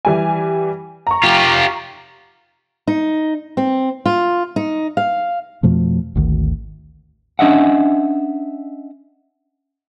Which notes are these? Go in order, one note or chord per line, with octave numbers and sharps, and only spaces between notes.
E3 G3 G#5
A#5 C#6
F4 G4
D#4
C4
F4
D#4
F5
F2 B2 F3 A3
G#1 D2 D#3
C#4 D4 D#5 E5 F#5